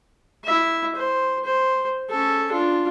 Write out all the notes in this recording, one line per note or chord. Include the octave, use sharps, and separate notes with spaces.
E4 E5
C5
C5
C#4 A4
D4 F4